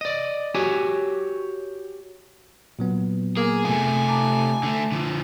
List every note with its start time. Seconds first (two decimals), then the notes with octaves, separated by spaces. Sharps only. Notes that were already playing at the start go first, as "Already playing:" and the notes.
0.01 D5 D#5
0.54 F#4 G4 C#5 G#5
2.79 A#2 F#3 B3
3.37 A#3 G#4
3.65 C3 A3 G#5
4.08 A5 A#5 D6
4.63 D3 A3
4.92 D3 F3